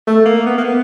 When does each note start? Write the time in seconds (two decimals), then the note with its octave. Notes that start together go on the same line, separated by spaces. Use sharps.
0.07 A3
0.26 A#3
0.46 B3
0.58 A#3
0.64 B3